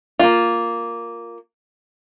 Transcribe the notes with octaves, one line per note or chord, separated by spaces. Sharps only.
A#3 F4